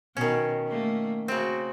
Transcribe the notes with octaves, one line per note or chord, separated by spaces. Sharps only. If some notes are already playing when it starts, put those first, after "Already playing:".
B2 D#3 C#4
A3 A#3
C#3 C4 F#4